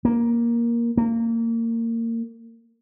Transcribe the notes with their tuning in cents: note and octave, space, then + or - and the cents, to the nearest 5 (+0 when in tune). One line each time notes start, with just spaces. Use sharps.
A#3 +10
A#3 -25